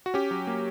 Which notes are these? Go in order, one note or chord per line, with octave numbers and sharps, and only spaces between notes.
F#4
C#4 G4
F#3
A#3